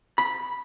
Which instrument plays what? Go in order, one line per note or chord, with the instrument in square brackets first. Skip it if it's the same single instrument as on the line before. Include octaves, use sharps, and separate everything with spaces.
[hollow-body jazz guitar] B5